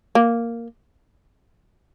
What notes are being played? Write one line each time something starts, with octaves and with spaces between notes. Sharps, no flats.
A#3